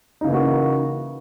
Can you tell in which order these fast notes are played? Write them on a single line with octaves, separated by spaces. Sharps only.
D#4 C#3 E3 A#3 F#4